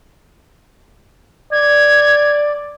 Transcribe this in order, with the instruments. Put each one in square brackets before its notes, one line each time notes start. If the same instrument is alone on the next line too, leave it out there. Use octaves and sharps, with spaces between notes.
[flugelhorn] D5 [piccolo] G#6